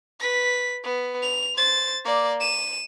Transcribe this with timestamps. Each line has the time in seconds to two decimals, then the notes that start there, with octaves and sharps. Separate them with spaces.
0.20 B4 B6
0.84 B3
1.22 F7
1.55 C5 A6
2.05 A#3 D5
2.41 D#7 E7